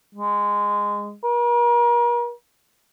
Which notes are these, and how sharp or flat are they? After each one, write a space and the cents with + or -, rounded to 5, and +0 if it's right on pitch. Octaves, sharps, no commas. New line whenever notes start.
G#3 -15
A#4 +40